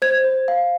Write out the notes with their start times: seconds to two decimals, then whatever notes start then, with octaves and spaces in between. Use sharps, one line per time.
0.02 C5 G#6
0.24 C5
0.48 F5